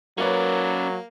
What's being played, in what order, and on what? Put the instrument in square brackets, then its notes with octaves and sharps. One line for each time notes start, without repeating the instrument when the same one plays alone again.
[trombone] F#3 [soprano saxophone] A#3 [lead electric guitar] C#4 D5 [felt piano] A#4 B4 C#5